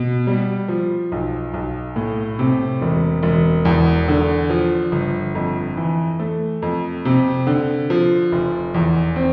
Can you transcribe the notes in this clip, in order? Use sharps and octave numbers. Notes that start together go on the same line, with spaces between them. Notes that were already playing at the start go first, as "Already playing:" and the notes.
Already playing: B2
G3
F3
B1
B1
A2
C3
E1
E1
E2
D3
F3
G1
F2
E3
A3
F2
C3
D3
F3
F1
E2
C4